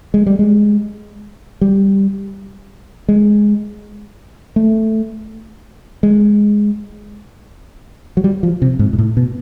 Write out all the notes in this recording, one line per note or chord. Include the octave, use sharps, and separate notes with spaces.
G#3
G3
G#3
G3
G#3
A3
G#3
F#3
G3
F3
C3
G#2
G#2
A2
B2